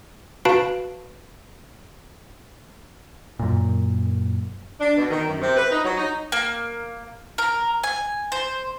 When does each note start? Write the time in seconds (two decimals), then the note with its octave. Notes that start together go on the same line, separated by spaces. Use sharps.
0.45 F#4 B4 F5 A5 B5 D7
3.39 F#2 A#2
4.80 D4
4.97 B2
5.11 D#3
5.28 F#2
5.41 C3
5.57 B4
5.71 D#4
5.85 F#3
5.97 D#4
6.32 A#3
7.38 A#4
7.84 G#5
8.32 C5